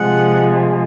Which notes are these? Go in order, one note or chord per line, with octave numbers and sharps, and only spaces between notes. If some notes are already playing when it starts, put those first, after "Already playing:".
Already playing: C3 F3 G#3 F#5